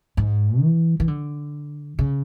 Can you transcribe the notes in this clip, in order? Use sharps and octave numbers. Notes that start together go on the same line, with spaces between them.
G#2
E3
E3
D3
C#3